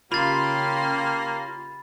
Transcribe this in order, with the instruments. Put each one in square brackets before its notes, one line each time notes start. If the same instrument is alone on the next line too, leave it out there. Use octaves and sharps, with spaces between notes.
[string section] C#3 G4 C6 [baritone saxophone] A#3 [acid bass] F4 [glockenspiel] B5 A6